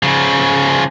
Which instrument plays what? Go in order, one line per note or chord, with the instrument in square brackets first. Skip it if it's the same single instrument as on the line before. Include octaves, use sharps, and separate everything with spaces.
[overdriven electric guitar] C#3 F3